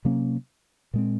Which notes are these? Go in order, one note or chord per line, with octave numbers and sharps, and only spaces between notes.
C3 F#3 A#3 C#4
A#2 G#3 C4